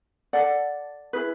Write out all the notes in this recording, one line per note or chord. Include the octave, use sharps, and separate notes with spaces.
A4 D5 F#5
E4 G#4 B4